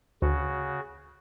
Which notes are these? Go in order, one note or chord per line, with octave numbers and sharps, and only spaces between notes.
D2 C#3 F#4